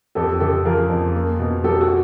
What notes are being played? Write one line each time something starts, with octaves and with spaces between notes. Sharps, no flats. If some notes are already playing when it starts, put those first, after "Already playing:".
F2 G4 A4
C#3 G4 A4
F3 G#4 A#4
F2
A#3
B2
F#3 G4 A4
F#4 G#4